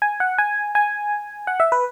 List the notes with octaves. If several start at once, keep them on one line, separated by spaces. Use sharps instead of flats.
G#5
F#5
G#5
G#5
F#5
E5
B4